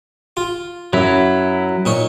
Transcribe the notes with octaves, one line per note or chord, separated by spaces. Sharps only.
F4
F#2 F#3 E4
A#2 D#4 C#5